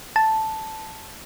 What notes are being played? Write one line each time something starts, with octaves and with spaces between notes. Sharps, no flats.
A5